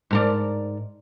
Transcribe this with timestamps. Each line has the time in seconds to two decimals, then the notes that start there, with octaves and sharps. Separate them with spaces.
0.11 G#2 A#4 D5